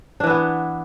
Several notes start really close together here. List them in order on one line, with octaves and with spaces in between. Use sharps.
D4 E3 E4 B3